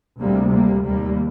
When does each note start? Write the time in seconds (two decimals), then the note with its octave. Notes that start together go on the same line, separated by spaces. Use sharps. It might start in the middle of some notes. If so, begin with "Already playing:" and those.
0.19 D2 C3 G3 A#3
0.52 G3 A#3
0.84 D#2 G3 A#3